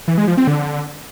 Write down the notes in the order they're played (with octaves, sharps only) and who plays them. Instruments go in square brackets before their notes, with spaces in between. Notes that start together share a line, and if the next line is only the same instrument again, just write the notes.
[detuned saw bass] E3
G#3
F3
C4
D3